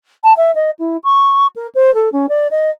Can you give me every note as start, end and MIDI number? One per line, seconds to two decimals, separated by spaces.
0.24 0.33 81
0.37 0.51 76
0.55 0.70 75
0.79 0.97 64
1.04 1.47 85
1.56 1.67 70
1.75 1.94 72
1.94 2.09 69
2.12 2.26 61
2.29 2.47 74
2.51 2.70 75